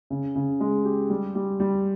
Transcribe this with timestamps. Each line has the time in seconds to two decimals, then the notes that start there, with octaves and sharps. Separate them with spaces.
0.10 C#3
0.35 C#3
0.60 G#3
0.85 G4
1.10 G3
1.35 G3
1.60 G3